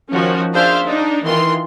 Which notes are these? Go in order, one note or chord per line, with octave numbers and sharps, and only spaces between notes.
D#3 F3 C#4 F#4
D4 G#4 C5 E5 F5
D4 D#4
D#3 E3 F4 C6